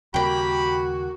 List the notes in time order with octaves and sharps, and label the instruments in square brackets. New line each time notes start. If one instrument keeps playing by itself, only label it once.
[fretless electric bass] D#2 C#3 G3 [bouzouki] A#3 G5 [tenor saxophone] F#4 [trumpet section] G4 B5